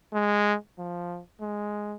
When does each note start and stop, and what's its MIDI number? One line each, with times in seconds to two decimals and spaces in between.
0.14 0.55 56
0.79 1.20 53
1.41 1.96 56